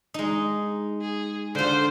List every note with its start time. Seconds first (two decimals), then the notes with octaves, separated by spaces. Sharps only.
0.14 G#3 D#4
1.01 G#4
1.55 D3 F4 C5